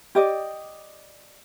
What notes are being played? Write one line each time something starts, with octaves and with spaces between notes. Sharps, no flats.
G4 D5 D#5